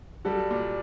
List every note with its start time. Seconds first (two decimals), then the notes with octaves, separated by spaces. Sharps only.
0.25 G3 F#4 A4
0.51 A#2